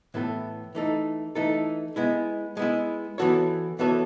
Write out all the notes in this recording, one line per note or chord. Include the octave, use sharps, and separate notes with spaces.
A2 E3 B3 E4 A4
E3 A3 D#4 A4
E3 A3 D#4 A4
G#3 B3 E4
G#3 B3 E4
E3 B3 F#4 A4 C#5
E3 B3 F#4 A4 C#5